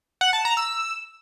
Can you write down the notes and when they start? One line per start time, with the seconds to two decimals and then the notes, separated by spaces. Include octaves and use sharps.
0.21 F#5
0.33 A5
0.45 A#5
0.57 E6